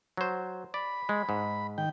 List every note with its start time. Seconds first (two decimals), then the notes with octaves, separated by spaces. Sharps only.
0.17 F#3 C5
0.74 D5 B5
1.09 G#3
1.29 G#2
1.78 D#3 G5